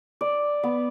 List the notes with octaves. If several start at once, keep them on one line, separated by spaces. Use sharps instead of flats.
D5
B3